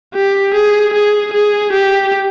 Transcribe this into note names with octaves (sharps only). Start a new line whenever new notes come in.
G4
G#4
G#4
G#4
G4